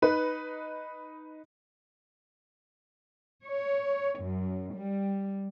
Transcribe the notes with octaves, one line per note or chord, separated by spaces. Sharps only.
D#4 B4
C#5
F#2
G3